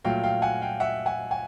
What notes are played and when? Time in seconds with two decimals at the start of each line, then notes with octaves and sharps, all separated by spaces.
0.05 A#2 F#3 A3 F5 G5
0.23 F5 G5
0.42 F#5 G#5
0.62 F5 G5
0.80 E5 F#5
1.06 F#5 G#5
1.31 F#5 G#5